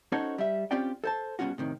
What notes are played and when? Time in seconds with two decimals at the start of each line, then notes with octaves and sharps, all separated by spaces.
0.12 C#4 D#4 F#4 A4 C5 C#5
0.38 G3 E5
0.71 C4 C#4 F4 G4 D5 G5
1.04 A4 C5 A5
1.39 G2 B2 F#3 C#4 F4 F#4
1.58 A2 C3 D#3